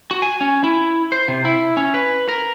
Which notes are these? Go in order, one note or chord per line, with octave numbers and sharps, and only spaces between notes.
F#4
G#5
C#4
E4
C5
C3
E4
C#4
B4
A#4